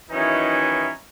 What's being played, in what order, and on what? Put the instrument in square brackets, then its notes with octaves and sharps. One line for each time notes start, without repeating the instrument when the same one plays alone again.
[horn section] D#3 E3 F#3 C#4 D#4 E4